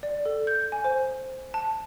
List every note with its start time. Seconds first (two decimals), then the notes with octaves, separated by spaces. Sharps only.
0.03 D5
0.26 A4
0.47 G6
0.72 G#5
0.84 C5
1.54 A5